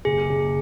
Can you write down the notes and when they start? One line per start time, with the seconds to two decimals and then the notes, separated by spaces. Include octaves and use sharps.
0.05 F#1 G#4
0.29 F#1